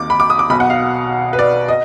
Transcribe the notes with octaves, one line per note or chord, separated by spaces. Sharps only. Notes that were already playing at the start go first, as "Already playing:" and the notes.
Already playing: D#2 D#3 D6
B5
D6
D#6
D6
B1 B2 B5
F#5
F5
B4
D5
D#5